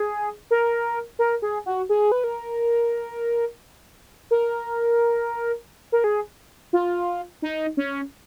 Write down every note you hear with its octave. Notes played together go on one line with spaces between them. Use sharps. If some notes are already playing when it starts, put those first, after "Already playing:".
Already playing: G#4
A#4
A#4
G#4
F#4
G#4
B4
A#4
A#4
A#4
G#4
F4
D#4
C#4